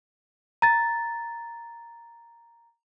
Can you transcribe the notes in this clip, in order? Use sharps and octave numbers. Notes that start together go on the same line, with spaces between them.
A#5 A6